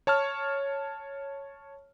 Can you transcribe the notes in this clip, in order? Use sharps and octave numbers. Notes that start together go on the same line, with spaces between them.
C#5 A5 C#6 F6